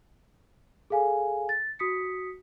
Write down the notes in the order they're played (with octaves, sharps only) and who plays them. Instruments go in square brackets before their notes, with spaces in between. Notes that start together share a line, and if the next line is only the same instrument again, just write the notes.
[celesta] G#4 A4 F5 G#5
A6
F#4 D#6 B6 C#7